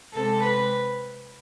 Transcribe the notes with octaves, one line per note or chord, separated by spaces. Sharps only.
C3 G#3 C4 A4
B4